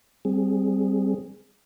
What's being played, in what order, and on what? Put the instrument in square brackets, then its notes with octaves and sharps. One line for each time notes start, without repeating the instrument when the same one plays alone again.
[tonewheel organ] G3 C4 G#4